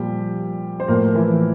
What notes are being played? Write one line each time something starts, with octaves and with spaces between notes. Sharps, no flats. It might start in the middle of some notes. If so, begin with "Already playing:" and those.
Already playing: A#2 F3 G3 G4
C5
A2 F3 A#3 A#4
E3 E4